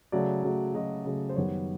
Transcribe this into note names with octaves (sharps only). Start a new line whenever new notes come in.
C#3 F#3 A3 D5
C#3 F#3 A3
C#3 F#3 A3 D#5
C#3 F#3 A3
C5
F#2 D#3 G3 B3 C#5